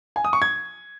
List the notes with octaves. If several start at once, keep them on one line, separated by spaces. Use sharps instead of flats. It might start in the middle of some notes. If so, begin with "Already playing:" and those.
G#5
D#6
C#6
G#6